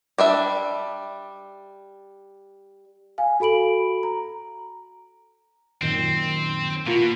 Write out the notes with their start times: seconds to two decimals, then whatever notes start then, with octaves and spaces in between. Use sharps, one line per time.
0.18 G3 D4 E5
3.18 F5 G#5
3.40 F#4 A4 B5 D7 F#7
4.03 A#5
5.82 F#2 A#2 D#3 C4
6.87 B2 A#3 F4